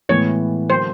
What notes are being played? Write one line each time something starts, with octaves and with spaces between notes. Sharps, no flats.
A2 E3 G#3 B3 C#5
D3 F#3 A#3 C5